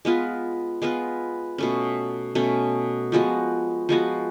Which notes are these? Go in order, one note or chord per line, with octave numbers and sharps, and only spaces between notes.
G#3 B3 F4 B4
G#3 B3 F4 B4
B2 A3 C#4
B2 A3 C#4
F3 G#3 B3 F#4
F3 G#3 B3 F#4